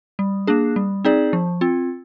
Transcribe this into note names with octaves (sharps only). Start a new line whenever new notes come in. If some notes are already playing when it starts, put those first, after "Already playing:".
G3
A#3 D4 G#4
G3
C4 D#4 G#4 D5
F3
C4 F4